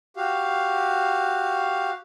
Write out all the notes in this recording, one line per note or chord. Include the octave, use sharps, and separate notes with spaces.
F#4 G4 F5